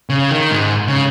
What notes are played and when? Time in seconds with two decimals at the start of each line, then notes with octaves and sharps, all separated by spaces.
0.10 C#3
0.31 D#3
0.51 G#2
0.88 C#3